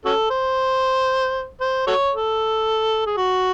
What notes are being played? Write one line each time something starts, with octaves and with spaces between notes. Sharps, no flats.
C#4 F#4 A4
C5
C5
F#4 A4 C#5
A4
G#4
F#4